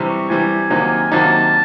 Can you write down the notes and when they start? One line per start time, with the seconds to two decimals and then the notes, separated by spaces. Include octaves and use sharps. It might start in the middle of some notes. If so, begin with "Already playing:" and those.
Already playing: C3 E3 G3
0.09 C#6
0.29 C3 E3 G3 G#5
0.70 C3 D#3 F#3 A#3 D#4
1.12 C3 D#3 F#3 A#3 D#4 A5